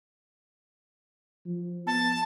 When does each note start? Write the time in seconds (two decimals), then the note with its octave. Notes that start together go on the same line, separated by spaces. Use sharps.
1.46 F3
1.87 B3 A5